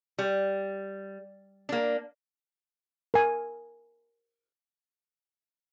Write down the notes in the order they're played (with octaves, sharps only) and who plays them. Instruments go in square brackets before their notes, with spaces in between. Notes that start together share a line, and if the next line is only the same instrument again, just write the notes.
[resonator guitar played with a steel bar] G3
A#3 D4
[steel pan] A#4 G#5